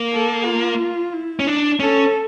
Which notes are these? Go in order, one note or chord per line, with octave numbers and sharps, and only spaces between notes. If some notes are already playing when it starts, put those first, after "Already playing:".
Already playing: A#3
A4
F4
E4
C#4
D4
C#4 A4